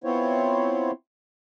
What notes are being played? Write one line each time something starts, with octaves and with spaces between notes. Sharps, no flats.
B3 C4 E4 F4 C5 C#5